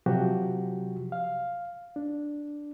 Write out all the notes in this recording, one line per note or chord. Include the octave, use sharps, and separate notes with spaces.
C3 F3 F#3 F#4 G4
F5
D4